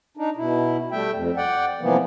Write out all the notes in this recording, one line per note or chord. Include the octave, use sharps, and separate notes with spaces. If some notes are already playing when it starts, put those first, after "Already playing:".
D4 D#4
B2 E4
G3 A3 E5 G5
F2
D5 F#5 G5
C3 E3 F3 G3 A#3 B3